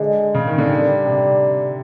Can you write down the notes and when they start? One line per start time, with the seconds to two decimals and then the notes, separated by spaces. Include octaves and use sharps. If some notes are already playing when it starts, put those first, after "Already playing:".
Already playing: D3 G#3
0.34 C#3
0.47 D#3
0.58 D3
0.70 G3
1.06 C3